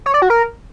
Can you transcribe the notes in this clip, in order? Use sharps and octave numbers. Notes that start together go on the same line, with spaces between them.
C#5
D5
F#4
A#4